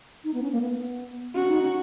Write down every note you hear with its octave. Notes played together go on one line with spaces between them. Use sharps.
D#4
B3
C#4
A#3
B3
C#4 F#4
D#4
C#4